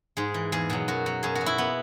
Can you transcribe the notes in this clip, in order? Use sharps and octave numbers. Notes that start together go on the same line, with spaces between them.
G#2 G#4
E3
E2 G#4
B2 F#3
F#2 F#4
F#3
F#2 G#4
F#4
F#3
E4
B3